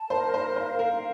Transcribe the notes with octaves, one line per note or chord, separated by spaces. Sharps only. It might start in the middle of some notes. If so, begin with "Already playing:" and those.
Already playing: A5
A#4 C5
C5
C5 F5
A#4